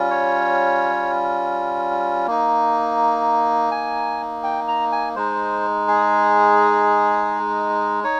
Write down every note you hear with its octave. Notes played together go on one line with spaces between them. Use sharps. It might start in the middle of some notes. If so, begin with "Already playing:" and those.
Already playing: G3 C#4 F4
C#5
A#3 D#4
G#5
G5
A#5
G#5
G#3 D#4 C5
G#4
D#4 C#5